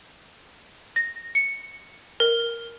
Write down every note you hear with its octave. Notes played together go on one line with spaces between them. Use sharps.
A#6
C#7
A#4